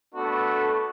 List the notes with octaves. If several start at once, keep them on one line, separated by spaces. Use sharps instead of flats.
A3 B3 D4 F#4 A4